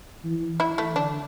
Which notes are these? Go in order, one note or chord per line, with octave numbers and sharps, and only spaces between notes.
E3
E3 E4
A3
D3 D4